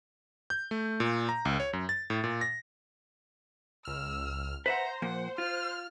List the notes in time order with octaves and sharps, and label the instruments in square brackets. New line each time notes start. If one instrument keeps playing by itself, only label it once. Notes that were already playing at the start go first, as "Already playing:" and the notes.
[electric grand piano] G6
A3
A#2
A#5
C#2
C#5
F#2
A6
A2
A#2
A#6
[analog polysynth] C#2 F6 [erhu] E6
[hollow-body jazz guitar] B4 E5 F#5 [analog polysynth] C5 [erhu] A#5
[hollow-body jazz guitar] A#2 F3 A#3 [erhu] F#5
[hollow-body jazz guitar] F4 [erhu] F6